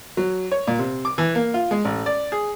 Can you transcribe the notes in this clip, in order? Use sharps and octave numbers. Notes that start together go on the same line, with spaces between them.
F#3
C#5
A#2
C3
D6
E3
A#3
F4
G#3
A1
D5
G#4